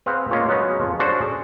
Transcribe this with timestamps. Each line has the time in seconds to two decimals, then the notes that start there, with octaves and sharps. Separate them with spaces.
0.06 C4 G#4 B4 F5 F#5
0.30 G#3 A#3 C#4 F4
0.48 F#3 G#3 B3 C#4 D#4
0.80 F2 F3
0.99 C#4 D4 F#4 G#4 A4 C5
1.21 G#4